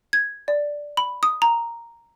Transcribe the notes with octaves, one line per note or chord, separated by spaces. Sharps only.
G#6
D5
B5
D#6
A#5